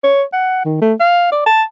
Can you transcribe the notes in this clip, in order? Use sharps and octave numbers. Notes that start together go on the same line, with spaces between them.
C#5
F#5
D#3
A3
F5
D5
A5